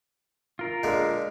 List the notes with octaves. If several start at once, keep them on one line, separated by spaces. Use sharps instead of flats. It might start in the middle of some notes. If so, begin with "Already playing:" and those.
F4 A#4
A#2 D3 G#3